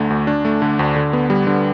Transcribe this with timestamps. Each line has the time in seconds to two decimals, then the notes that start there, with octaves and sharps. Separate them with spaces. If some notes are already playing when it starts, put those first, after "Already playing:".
Already playing: D2 D3 A3
0.10 D2
0.27 D4
0.45 A3
0.62 D3
0.79 D2
0.96 D3
1.13 B3
1.30 G3
1.47 D3